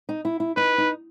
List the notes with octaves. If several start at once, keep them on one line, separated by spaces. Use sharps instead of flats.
D#4
E4
E4
D#4 B4
D#4